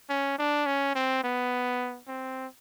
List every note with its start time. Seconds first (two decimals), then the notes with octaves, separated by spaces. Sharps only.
0.10 C#4
0.39 D4
0.66 C#4
0.95 C4
1.24 B3
2.08 C4